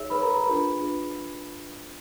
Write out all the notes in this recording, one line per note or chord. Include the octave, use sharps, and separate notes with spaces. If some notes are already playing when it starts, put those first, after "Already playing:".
Already playing: D#4 G#4 C#5 E5 E6
D#4 G#4 B4 C#5 B5
A#4 A#5
B5
A#4 A#5
D4 F4 G#4 B4 B5
D4 F4 G#4 B4